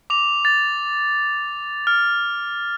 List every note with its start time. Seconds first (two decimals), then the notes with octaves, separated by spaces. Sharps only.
0.10 D6 F7
0.45 A6
1.87 F6